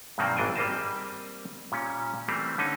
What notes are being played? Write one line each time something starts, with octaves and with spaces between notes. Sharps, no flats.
G2 B2 D#3 F#3 A#3 C4
G#1 E3 D4 G5 G#5
G3 A#3 C4 D#5 A5
A#2 G3 C#4
E3 G3 A3 A#3 C4
D3 C#4 D#4